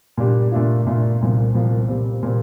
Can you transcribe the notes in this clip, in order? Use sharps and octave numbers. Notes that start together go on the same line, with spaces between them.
A#2 G3 D4 G4
A#2 A3 D4 F4
A#2 A3 D4 F4
C2 A#2 F3
C2 A#2 F3
A#2 G3 C4
A#2 G3 C4